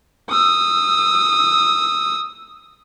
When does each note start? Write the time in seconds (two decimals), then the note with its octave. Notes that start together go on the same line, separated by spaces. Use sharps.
0.30 D#6 E6